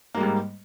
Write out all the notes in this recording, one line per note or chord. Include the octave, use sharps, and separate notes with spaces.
G#2 G3 G#3 A#3